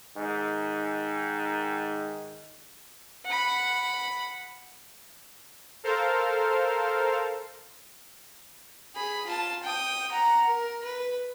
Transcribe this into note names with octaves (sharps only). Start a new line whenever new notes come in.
G#2 D#3
F#5 B5
A4 A#4 C5 F5
G#4 B5
F4 A5
G5 D#6
F#5 A#5
A#4
B4